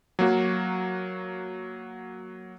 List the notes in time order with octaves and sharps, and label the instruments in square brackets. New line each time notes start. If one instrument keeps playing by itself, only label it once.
[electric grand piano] F#3 A#3 F#4